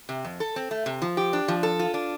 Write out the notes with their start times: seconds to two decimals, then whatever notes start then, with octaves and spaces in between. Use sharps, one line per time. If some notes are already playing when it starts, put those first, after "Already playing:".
0.09 C3
0.25 F2
0.40 A4
0.56 C4
0.71 A3
0.86 C3
1.02 F3
1.17 G4
1.33 D4
1.48 F3
1.63 A4
1.79 F4
1.94 D4